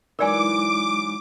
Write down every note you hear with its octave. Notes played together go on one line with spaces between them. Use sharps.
E3 F#3 G#3 D#4 A#4 D5 G#5 D6